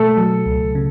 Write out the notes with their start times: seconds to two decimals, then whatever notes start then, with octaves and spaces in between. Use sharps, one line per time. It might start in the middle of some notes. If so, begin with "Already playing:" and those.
Already playing: B2 A3 A4
0.17 F#3
0.46 C#2
0.75 C#3